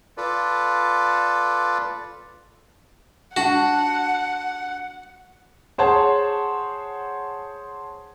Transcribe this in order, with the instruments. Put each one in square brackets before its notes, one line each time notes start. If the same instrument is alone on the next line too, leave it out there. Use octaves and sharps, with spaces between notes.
[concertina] F4 A4 B4 D5
[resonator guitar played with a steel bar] D4 A5 [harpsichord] F#4 [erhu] F#5
[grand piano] G#4 C5 C#5 F#5 A5